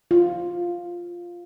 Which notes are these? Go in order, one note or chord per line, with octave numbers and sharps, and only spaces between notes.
F4